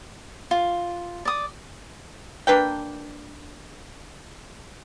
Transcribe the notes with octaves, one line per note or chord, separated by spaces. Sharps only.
F4
D5 D#6
A#3 D4 B4 G5